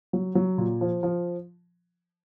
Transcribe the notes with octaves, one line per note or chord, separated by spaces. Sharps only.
F#3
F#3
A#2
F3
F3